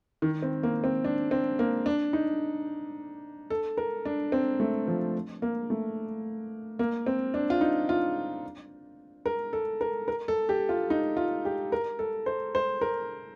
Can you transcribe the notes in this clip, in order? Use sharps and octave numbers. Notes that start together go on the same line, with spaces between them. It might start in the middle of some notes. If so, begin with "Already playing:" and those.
D#3
C4
A#3
C4
D4
C4
A#3
D4
D#4
A4
A#4
D4
C4
A3
F3
A#3
A3
A#3
C4
D4
F4
D#4
F4
A#4
A4
A#4
A#4
A4
G4
F4
D#4
F4
G4
A#4
A4
C5
C5
A#4